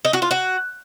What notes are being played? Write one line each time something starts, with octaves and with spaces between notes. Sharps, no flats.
D#4
F#4
F4
F#4